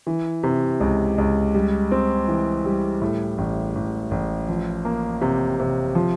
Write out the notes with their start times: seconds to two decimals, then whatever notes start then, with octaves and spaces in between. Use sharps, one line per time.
0.07 E3
0.43 C3
0.80 C#2
1.18 C#2
1.54 G3
1.92 C4
2.28 E3
2.65 G3
3.02 A2
3.38 A1
3.75 A1
4.11 A1
4.49 F3
4.85 A#3
5.22 C3
5.60 C3
5.95 F3